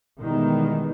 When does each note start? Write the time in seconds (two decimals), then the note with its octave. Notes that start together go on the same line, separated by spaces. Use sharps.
0.20 B2 D#3 E3 G3 G#3 B3